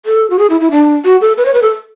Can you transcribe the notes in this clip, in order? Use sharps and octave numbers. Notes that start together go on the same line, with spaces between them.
A4
F#4
G#4
E4
E4
D4
F#4
A4
B4
C#5
B4
A4